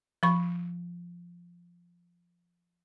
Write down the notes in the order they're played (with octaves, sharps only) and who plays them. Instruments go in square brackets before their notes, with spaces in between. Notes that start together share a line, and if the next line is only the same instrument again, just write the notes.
[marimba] F3 B5 C#6